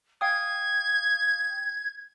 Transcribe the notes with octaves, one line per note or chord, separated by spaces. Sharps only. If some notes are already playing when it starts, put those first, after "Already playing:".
F5 G5 D#6 G#6